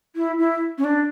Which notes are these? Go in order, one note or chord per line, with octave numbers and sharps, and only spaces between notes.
E4
E4
C#4
D4